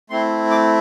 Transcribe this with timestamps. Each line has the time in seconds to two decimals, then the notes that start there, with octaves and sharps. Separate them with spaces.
0.10 A3 C4 E4 C6
0.51 D6